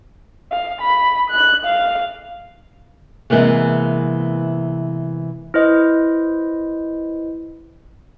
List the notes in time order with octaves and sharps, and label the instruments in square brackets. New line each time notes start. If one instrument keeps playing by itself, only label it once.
[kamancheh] F5
B5
F#6
F5
[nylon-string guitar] C3 E3 G#3 A#3 B3
[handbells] E4 B4 C5 D#5